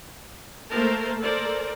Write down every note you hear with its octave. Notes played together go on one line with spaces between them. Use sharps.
A3 A#3 A#4 C5 A5
A4 A#4 C5 D5